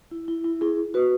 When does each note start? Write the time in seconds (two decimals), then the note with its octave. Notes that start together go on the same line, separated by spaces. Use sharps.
0.11 E4
0.28 E4
0.44 E4
0.61 E4 G#4
0.94 F#4 B4